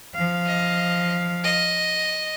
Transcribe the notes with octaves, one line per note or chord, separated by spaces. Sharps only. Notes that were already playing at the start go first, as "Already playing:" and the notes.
F3 F5
D#5
D#5